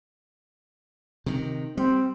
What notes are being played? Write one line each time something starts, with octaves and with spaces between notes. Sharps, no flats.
C3 D#3
G3 C4